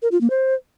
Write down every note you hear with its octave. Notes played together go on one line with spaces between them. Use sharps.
A#4
F4
A#3
C5